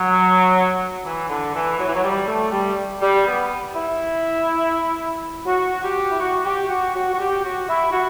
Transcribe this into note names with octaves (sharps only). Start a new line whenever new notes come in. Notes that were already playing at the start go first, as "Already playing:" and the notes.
Already playing: F#3
E3
D3
E3
F#3
E3
F#3
G3
A3
G3
G3
B3
E4
F#4
G4
E4
F#4
G4
F#4
F#4
F#4
G4
F#4
E4
F#4